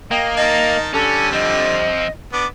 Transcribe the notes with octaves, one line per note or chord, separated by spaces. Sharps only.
A#3 D#5 G5
D#3 D#4 D#5 A5
D3 G3 C#4 A4
F3 C4 D#5
B3 D4 D6